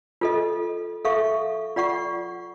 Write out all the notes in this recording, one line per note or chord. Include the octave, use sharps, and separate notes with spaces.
F4 A4 D#5
A4 E5 F5 C#6
F4 D5 F#5 C#6